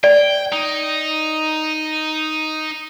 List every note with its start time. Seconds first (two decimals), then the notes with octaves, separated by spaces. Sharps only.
0.04 D5 G5
0.53 D#4